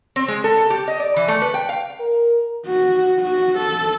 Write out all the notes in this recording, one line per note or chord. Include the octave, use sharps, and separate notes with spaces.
C4
G#3
A4
A4
G4
D#5
D5
E3
A3
B4
G5
F5
A#4
F#4
F#4
A4